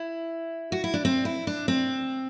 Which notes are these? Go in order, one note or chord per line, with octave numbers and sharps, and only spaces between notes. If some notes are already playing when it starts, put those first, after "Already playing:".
Already playing: E4
F#4
E4
D4
C4
E4
D4
C4